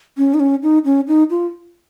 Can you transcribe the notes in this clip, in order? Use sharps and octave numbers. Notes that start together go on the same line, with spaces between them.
C#4
D#4
C#4
D#4
C#4
D#4
F4